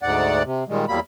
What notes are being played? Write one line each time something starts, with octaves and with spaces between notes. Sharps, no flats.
D2 G#2 D5 F#5
C3
A#2 D#3 G3 G#3
E2 F#3 G3 A#3 B5